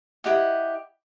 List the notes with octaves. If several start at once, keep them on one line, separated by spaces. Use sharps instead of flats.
E4 G4 D#5 F#5